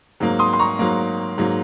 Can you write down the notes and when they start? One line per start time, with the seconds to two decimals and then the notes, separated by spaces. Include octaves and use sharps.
0.20 G#2 F#3 A#3
0.39 C6 D#6
0.53 C6
0.59 A#5 C#6
0.79 G#2 F#3 A#3
1.38 G#2 F#3 A#3